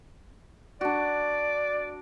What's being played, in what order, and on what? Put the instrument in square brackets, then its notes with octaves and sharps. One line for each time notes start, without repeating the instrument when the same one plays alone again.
[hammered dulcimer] D4 F#4 [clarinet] D5